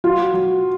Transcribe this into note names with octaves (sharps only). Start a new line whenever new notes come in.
F#3 F4
F#3